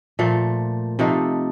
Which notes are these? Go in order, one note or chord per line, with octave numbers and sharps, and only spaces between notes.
A#2 F3 A3
C3 F3 A3 D#4